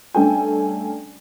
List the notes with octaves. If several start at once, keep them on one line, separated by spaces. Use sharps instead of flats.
G2 A3 C#4 A4 G5 G#5